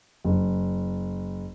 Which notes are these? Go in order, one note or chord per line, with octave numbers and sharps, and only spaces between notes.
F#1